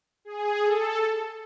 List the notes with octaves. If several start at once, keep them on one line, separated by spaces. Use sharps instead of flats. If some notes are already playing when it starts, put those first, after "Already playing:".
G#4
A4